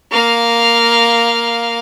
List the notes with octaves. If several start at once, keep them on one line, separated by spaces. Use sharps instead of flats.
A#3 F5